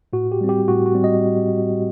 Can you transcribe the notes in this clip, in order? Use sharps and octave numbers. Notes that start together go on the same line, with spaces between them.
A2 F#4
G4
G3 C4
G4
A2 F#4
F#4
G3 C4
D#5